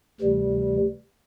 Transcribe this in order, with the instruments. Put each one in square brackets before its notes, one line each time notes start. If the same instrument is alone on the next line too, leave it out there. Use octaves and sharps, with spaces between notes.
[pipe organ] D2 C3 E3 G3